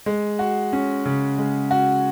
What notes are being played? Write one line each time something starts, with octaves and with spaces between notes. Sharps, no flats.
G#3
F#4
C#4
C#3
G#3
F#4